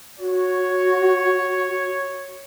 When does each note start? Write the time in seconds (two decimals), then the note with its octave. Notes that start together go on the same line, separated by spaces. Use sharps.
0.19 F#4 C#5